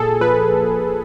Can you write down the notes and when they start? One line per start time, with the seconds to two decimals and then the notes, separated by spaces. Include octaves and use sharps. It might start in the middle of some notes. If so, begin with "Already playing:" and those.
Already playing: A#2 A#3 G#4 A4
0.21 F3 B4